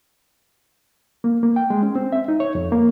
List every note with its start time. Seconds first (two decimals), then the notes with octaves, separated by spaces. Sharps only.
1.24 A#3
1.43 A#3
1.56 G5
1.70 G#3
1.83 C#4
1.96 C4
2.12 E5
2.28 D#4
2.40 C#5
2.55 F2
2.72 A#3